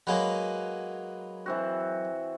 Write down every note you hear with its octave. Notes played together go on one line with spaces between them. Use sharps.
F#3 G#3 A#3 B4 G#5
E3 C4 F#4